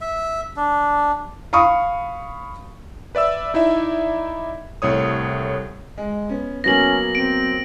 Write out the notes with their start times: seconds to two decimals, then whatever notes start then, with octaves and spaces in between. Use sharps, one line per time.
0.01 E5
0.56 D4
1.53 F5 B5 C#6 D#6
3.15 B4 D5 E5 E6
3.54 D#4 E4 D5 E5
4.82 C2 A2 C#5 D#6
5.98 G#3
6.29 B3 C#4
6.64 F#3 A#3 B3 C#4 A#6 F#7
7.15 C4 D7